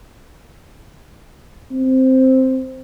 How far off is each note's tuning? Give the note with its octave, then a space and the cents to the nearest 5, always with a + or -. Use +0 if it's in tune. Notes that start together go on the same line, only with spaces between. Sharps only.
C4 +0